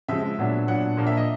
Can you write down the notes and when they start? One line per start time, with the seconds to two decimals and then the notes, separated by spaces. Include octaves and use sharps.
0.08 C#3 F3 G#3 E5
0.38 A#2 F#3 B3 D4
0.68 A#2 F#3 B3 D4 F#5
0.97 A#2 F3 A#3 D4
1.07 E5
1.17 D#5